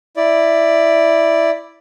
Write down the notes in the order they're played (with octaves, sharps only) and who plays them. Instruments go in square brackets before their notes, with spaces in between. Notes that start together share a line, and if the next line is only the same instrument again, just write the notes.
[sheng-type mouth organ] E4 D5